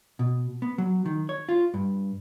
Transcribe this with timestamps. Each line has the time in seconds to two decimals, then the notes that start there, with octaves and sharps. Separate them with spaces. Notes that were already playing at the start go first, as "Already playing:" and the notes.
0.19 B2
0.62 B3
0.78 F#3
1.06 D#3
1.29 C#5
1.49 F4
1.74 G2